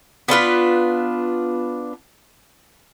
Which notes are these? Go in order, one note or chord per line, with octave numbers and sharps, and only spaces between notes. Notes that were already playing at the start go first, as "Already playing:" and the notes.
B3 D4 F4 B4